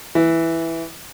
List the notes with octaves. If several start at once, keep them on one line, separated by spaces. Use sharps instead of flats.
E3